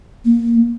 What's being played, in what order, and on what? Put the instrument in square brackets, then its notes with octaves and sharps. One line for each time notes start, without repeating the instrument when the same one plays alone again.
[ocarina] A#3